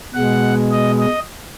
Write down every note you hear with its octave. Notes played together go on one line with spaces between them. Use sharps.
B2 G#3 F#5
D#5
D#5